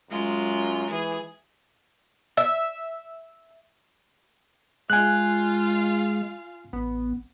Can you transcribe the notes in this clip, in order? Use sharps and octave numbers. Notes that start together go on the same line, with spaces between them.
F#2 G#3 F4
E3 G#4
E5
G#3 F4 F5 G#5 F#6
A1 B3